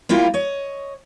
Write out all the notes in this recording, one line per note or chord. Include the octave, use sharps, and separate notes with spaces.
G3 A#3 E4 F4 G4 A#4
C#5 D#5